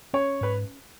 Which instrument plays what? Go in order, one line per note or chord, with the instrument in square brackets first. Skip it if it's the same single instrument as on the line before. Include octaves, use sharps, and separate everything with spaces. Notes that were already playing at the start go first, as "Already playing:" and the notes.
[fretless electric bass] C#4 [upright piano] C#5
[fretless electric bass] G#2 [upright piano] B4